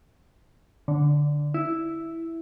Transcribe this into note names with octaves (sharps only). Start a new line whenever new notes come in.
D3
E4